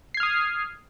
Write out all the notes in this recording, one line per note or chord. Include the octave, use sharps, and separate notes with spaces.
D#6 F6 G#6 C7